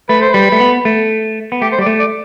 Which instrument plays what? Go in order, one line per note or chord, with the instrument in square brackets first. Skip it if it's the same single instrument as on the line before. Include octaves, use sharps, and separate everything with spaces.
[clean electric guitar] A3 [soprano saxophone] B4
[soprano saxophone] C5
[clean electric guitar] G3 [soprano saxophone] B4
[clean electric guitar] A3
B3
A3
B3
[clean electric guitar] A3 [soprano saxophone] G4
[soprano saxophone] C5
[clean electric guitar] G3 [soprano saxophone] D5
[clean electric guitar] A3
[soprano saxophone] D5